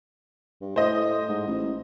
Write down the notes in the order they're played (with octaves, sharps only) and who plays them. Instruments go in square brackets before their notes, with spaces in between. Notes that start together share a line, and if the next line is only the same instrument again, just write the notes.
[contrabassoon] G2
[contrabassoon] A2 [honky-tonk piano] C5 D#5
[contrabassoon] G#2
A1